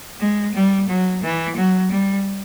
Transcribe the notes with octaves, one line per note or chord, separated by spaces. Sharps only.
G#3
G3
F#3
E3
F#3
G3